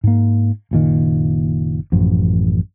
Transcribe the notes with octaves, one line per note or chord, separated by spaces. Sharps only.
G#2 A#3
F#1 A#2 D#3
A1 F#2 F3